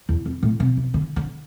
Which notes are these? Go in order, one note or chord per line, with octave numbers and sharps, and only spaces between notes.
E2
F2
A2
C3
C3
D3
D3